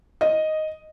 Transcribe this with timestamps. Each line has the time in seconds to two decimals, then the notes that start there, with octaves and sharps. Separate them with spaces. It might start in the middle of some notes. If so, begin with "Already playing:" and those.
0.21 D#5